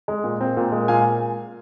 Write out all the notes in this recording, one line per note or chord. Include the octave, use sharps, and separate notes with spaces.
G#3
A#2
C4
A#2
G#3
A#2 F5 G#5